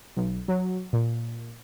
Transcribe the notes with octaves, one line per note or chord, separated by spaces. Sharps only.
B1
F#3
A#2